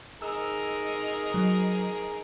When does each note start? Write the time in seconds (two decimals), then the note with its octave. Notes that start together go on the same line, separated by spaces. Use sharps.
0.22 D#4 G#4 A#4 E6
1.34 F#3